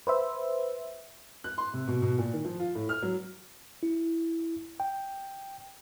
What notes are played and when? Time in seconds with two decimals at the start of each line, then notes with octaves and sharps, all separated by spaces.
0.07 B4 C5 E5
1.44 F#6
1.58 C6
1.73 C3
1.88 B2
2.02 B2
2.18 A#2
2.33 D#3
2.45 F3
2.60 F4
2.75 A2
2.89 F6
3.02 F#3
3.83 E4
4.80 G5